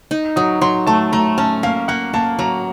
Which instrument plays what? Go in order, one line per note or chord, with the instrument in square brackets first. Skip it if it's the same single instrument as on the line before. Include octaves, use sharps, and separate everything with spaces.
[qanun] D#4
[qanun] F#3 [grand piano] D#6
[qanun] F#3 [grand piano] C6
[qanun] A3 [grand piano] A5
[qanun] A3 [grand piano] A#5
[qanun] C#4 [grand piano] A5
[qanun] A#3 [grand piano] F5
[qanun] A#3 [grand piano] F#5
[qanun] A#3 [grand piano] A5
[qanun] F#3 [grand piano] A#5